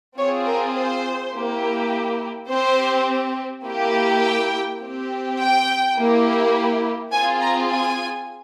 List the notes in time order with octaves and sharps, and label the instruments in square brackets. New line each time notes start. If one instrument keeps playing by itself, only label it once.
[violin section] C4 F4 G#4 C#5
A#4
C5
A#3 E4 G4
C4 G4 C5
A#3 E4 G4
G5
C4 G4
G5
A#3 E4 G4
C4 F4 G#4 G#5
A#5
G#5